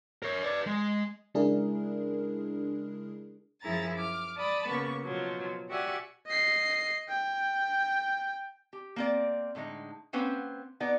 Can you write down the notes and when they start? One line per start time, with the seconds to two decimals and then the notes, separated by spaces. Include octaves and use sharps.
0.22 A#4 C#5
0.44 B4 D5
0.66 G#3
1.34 C#3 G#3 D4 E4 G#4 A#4
3.62 F#2 F3 E4 G#4 A#5 A6
3.96 D6 F6
4.38 D5 A5 B5 D#6
4.68 C#3 A#3 B3 C#6
5.03 B2 F3 F#3
5.69 F#4 G4 D5 E5 F#5 G#5
6.26 D#5 C7
7.08 G5
8.73 G4
8.96 A#3 C4 D5
9.55 A2 D3 G#3 D#4
10.13 A#3 C4 C#4 B4 C5 F#5
10.80 B3 D#4 D5